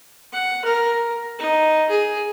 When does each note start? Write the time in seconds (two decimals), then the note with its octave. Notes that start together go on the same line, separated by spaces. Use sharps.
0.32 F#5
0.65 A#4
1.39 D#4
1.89 G#4